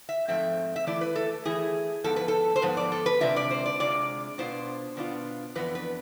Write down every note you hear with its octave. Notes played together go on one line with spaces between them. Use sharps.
E5
G#2 F3 A3 C4 E5
E5
E3 A3 E4 D5
B4
A4
E3 A3 E4 G#4
G#2 F3 B3 A4
B4
A4
C5
G#2 F3 B3 B4
D5
A4
B4
C3 G#3 D4 F4 E5
D5
C5
D5
C3 G#3 D4 F4 D5
B2 B3 D4 F4 C5
B2 B3 D4 F4
F2 E3 B3 D4 B4
B4